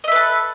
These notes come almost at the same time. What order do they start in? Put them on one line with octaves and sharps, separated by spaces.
D#5 E5 B4 A4